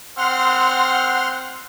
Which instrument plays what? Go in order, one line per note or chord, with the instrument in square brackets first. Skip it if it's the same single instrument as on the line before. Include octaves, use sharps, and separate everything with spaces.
[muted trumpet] C4 [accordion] F#5 C6 F6